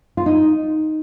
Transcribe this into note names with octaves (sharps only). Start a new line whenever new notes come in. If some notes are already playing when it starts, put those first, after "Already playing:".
F4
D#4